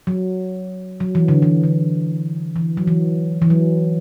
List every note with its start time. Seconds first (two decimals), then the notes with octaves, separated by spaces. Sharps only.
0.07 F#3
1.00 F#3
1.15 E3
1.28 D3
1.42 E3
1.64 D3
2.56 E3
2.77 F#3
2.87 E3
3.42 E3
3.50 F#3